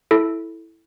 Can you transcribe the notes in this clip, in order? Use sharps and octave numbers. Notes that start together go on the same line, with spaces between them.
E4 A4